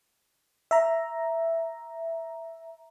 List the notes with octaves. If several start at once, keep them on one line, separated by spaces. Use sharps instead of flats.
E5 A#5